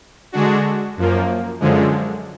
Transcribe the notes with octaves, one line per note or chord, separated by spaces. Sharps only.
D3 G#3 D4 F#4
F#2 F3 A#3
F#2 D3 F3 G#3